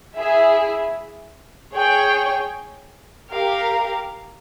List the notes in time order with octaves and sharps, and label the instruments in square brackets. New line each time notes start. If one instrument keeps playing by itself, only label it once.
[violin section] E4 G#4 E5
G#4 C#5 G5
G4 A#4 F5